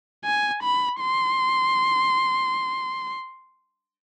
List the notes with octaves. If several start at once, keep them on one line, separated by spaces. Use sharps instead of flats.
G#5
B5
C6